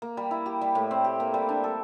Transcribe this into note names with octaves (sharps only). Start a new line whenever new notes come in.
A#3
G3
E4
G4
G3
A2
C4
G4
A#3
G3
D4
A4